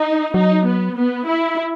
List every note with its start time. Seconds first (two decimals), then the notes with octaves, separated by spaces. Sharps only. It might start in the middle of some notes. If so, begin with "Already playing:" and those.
Already playing: D#4
0.34 F#3 D#4
0.65 B3
0.95 B3
1.26 E4